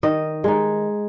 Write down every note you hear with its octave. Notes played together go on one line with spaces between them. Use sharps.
D#3 D#5
G#3 D#4